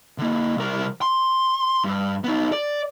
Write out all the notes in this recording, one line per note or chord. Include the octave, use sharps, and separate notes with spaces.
D3 A#3
C2 A#4
C6
G2
B3 D#4
D5